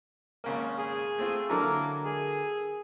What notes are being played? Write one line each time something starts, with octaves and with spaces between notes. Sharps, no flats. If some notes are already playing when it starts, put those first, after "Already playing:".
G#1 C#3 A#3
G#4
A3 C4 F4
D3 F#3 A#3 E4 A4 A#4
G#4